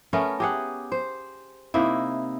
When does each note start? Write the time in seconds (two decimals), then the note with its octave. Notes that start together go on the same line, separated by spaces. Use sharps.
0.13 A3 B3 C#4 A#4
0.40 G4 G#4 F#5
0.92 C5
1.74 C3 A#3 D#4 E4